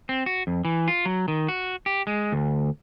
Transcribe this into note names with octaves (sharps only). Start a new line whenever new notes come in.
C4
F#4
F2
E3
F4
F#3
D#3
F#4
G4
G#3
D2